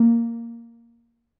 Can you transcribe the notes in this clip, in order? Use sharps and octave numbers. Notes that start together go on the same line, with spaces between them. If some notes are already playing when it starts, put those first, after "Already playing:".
Already playing: A#3